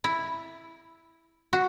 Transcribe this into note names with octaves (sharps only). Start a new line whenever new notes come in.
E4
F#4